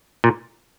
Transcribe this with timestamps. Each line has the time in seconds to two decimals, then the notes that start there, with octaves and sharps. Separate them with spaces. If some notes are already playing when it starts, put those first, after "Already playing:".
0.24 A#2